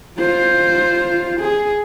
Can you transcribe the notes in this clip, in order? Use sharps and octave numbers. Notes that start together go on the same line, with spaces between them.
F4 C5
G#4